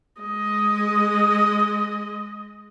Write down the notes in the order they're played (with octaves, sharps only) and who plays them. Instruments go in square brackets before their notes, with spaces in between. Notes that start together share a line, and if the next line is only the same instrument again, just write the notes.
[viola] G#3 D#5